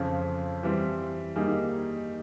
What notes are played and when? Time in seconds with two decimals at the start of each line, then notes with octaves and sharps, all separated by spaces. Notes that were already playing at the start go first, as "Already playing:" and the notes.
Already playing: F2 C#3 F3
0.63 E3 G3 C4
1.36 D#3 G3 A#3 D#4 G#4